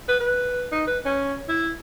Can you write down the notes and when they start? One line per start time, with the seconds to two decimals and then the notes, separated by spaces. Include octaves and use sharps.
0.08 B4
0.20 B4
0.72 D#4
0.87 B4
1.05 C#4
1.48 E4